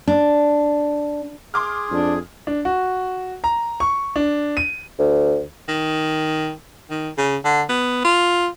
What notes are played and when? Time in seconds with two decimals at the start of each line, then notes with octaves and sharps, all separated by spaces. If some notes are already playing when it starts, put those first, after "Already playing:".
0.07 D4
1.54 G#4 C6 D6 F6
1.91 F2 D4
2.47 D4
2.65 F#4
3.44 A#5
3.80 C#6
4.16 D4
4.57 D#7
4.99 D2
5.68 D#3
6.90 D#3
7.18 C#3
7.45 D3
7.69 B3
8.05 F4